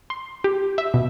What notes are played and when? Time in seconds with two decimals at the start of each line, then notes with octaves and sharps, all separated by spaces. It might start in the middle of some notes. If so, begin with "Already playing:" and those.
0.10 C6
0.44 G4
0.78 E5
0.94 B2